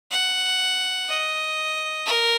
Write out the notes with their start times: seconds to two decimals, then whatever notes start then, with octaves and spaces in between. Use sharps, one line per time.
0.11 F#5
1.09 D#5
2.06 A#4